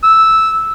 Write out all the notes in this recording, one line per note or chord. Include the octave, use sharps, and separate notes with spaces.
E6